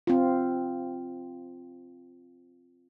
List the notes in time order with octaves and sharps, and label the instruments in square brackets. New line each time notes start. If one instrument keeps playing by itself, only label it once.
[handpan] C4 F4